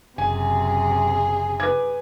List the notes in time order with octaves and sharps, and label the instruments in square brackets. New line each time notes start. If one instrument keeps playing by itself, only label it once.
[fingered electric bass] F#1 [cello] F#2 C3 [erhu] G#4 [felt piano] G#5
[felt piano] B4 D6 G#6